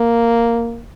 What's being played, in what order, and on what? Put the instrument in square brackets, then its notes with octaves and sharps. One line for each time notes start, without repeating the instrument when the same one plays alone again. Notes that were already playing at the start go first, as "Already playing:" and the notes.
Already playing: [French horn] A#3